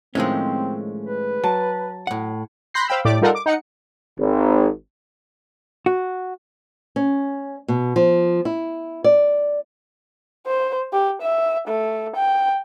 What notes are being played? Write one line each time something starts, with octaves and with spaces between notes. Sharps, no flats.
A2 D#3 F3 G#3 A3 C4 C#4
B4
F#3 A5
A2 F#5
B5 C6 F#6 G6 A#6 C7
C5 F5 G5 B5 E6
A2 A3 G4 D5 D6
G3 D#4 F4 A4 A#4 F#5
D6
D#4 F#5 C#7
G#1
F#4
C#4
B2
F3
E4
D5
C5
G4
E5
A3
G5